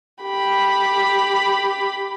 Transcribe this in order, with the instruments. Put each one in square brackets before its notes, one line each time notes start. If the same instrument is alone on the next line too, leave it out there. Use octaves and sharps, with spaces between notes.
[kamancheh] G4 B5